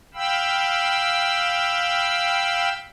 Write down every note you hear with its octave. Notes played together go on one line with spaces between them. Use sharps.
F5 G5 B5 E6